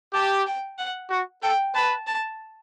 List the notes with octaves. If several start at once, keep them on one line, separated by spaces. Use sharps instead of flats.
G4 A5
G5
F#5
F#4
A4 G5
B4 A5
A5